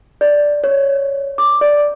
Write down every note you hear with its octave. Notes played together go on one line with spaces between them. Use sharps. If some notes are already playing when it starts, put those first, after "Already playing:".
D5
C#5
D6
D5